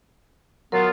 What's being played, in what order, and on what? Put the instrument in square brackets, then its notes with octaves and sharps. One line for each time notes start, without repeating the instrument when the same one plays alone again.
[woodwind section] F#3 B3 F4 [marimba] A#4